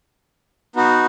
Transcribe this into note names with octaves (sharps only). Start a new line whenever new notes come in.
B3 D#4 F#4